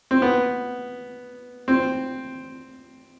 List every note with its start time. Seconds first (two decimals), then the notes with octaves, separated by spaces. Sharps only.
0.11 C4
0.22 B3
1.68 C4